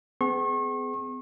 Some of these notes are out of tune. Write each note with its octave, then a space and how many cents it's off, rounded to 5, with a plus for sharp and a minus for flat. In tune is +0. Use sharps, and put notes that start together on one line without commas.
B3 +45 G#4 +15 C#6 -40